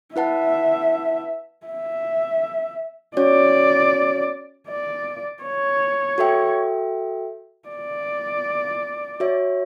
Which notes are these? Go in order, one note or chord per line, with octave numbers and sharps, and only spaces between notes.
E4 B4 E5 F#5 A5
E5
C#4 F#4 C#5 D5
D5
C#5
F#4 A4 E5 G5
D5
F#4 C#5 E5